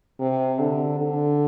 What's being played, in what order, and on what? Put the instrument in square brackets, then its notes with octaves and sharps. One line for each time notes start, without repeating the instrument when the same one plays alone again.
[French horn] C3
D3
D3